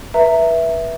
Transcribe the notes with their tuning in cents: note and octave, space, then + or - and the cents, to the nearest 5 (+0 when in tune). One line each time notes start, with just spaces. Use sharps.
B4 -25 E5 +0 A#5 -15